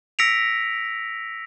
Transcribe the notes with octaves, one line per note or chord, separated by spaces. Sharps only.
E6 A#6 B6 C#7 D7 F7